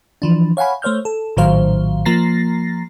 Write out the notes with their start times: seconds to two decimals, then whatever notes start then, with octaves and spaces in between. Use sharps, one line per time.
0.22 E3 F3 D4
0.57 C#5 F5 F#5 G#5 B5
0.82 A3 C5 C#5 F6 G6
1.05 A4
1.37 A#1 A2 D#3 F#3 C5 F5
2.05 F3 A#3 A#5 A6 A#6 C7